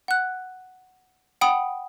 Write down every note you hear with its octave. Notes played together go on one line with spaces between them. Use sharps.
F#5 F#6
F#5 G5 B5 D#6